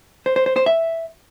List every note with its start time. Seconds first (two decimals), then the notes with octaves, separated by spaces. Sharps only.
0.26 C5
0.36 C5
0.46 C5
0.56 C5
0.66 E5